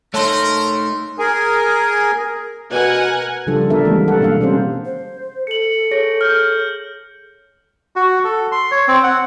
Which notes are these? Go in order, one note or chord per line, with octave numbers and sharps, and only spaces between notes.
A3 D#4 A#4 C#5 A5 C6 F#6
G#4 A#4 G#5
B2 A#4 F#5 G#5
C#3 F3 G3 D4 F4 A4
D3 B3 D4 A4 A#4 E5
E3 G3 G#3 A#3 C4
G3 A4 F#5
B2 E3 A#3 D4 F5
G3 C4 C#4 G#4 C5
C5
A4 C#7 F#7
G#4 C#5 A#6
F6 G6
F#4
A4
C6
C#5
C4
F#5